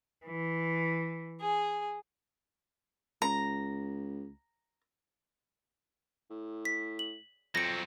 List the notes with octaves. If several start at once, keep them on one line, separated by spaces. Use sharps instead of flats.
E3
G#4
C#2 A#5
A2
B6
F#7
F2 F#3 C4 A#6 C#7